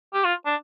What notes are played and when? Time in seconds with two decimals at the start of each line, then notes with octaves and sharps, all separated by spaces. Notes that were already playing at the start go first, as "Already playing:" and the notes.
0.14 G4
0.24 F4
0.46 D4